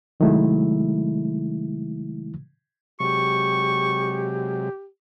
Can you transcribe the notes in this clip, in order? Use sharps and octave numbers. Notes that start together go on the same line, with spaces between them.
C3 D#3 F#3 G#3 A3 E4
C3 F#3 G#3 G4 C#6